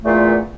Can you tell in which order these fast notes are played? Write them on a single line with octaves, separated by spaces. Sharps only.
A3 E2 A#2